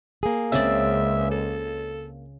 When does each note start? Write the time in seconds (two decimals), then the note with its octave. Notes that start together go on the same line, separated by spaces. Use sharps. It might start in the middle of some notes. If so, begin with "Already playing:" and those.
0.23 A#3 G#4
0.52 C#2 C#3 C4 D5 E5
1.31 A4